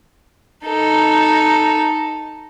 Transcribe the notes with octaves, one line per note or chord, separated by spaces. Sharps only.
D#4 A4